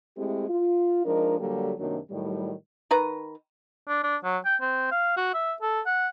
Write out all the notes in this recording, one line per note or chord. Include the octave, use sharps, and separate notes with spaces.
G#3 A3 C4 E4 G4 G#4
F4
F3 G#3 D4 D#4 A#4
D3 F#3 G3 A#3 G4 A4
F#2 C3 D#3 F#3 A#3 D4
A2 D#3 F#3 G3
D#3 B4 A#5
D4
D4
F#3
G5
C4
F5
F#4
E5
A4
F#5